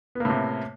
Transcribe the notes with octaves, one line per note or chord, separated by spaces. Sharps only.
A2 C3 A#3 B3